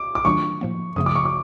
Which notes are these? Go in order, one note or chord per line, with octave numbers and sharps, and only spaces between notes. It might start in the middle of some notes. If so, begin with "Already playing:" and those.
Already playing: D6
D6
D#3 F#3 A3 D4 F4 C#6
A2 F3 A#3
F#2 C#3 F3 A3 D#6
D6
C#6
D6